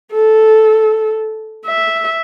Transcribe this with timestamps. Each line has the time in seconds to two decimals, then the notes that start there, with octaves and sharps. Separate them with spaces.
0.13 A4
1.66 E5